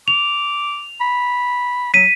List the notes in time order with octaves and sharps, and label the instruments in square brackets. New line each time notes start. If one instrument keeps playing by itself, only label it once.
[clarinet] D6 [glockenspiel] F7
[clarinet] B5
[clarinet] F#3 [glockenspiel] B6 D#7